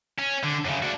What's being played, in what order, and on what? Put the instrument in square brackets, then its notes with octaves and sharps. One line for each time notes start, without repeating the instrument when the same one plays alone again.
[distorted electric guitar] C#4
D3
F#2 C#3
D4 F#4